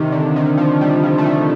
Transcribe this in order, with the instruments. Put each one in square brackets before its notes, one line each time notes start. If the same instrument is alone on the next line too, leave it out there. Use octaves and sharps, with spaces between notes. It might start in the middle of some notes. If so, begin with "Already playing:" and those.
Already playing: [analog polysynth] C3 D#3
D3
D#3
F3
G3
F3
A3
G3